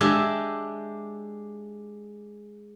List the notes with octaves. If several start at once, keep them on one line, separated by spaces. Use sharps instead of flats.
G#3 D4 G4 E5 G#5